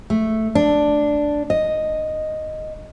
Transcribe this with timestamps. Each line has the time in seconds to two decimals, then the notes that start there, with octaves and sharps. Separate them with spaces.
0.10 A3
0.55 D4
1.50 D#5